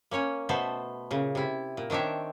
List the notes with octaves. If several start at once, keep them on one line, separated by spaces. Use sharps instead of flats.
A#3 C#4 C#5 G#5
B2 A3 B3 A4 C5
A#2 C#3
C3 E4
A#2
D#3 C4 D4 C#5 E5